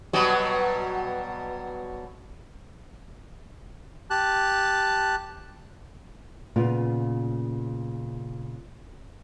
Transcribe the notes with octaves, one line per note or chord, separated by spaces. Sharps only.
B2 F#3 G3
G4 A5 F#6
A#2 C#3 B3 F4